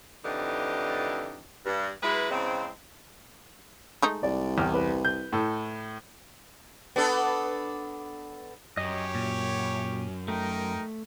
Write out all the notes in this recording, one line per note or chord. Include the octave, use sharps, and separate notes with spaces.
F2 A2 D3 E3 D#4 G4
G2
F#3 G#3 E4 G#4 B4
E2 C#3 G#3 C4
G#3 A3 D#4
C2 D5
E2 G5 D6 F6
B4
G6
A2 A4
B3 D4 A4
F#2 G4 C#5 D#5
A#2
A3 D#4 A#4 G5